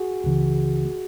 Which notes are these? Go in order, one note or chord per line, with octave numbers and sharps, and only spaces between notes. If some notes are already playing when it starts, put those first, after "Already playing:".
Already playing: F#4 G#4
C#2 C#3 E3